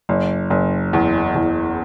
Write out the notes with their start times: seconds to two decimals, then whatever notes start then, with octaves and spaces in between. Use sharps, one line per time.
0.09 F#1
0.50 F#1
0.93 E2
1.35 E2